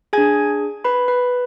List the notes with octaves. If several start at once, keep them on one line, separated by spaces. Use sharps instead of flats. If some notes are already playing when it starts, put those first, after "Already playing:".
D4 G#4 G#5 G#6
B4 B5
B4 B5